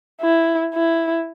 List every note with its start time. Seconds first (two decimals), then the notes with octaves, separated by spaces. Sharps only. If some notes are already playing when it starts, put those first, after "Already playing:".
0.21 E4
0.74 E4